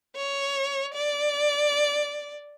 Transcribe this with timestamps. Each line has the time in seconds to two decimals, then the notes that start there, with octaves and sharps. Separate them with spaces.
0.16 C#5
0.94 D5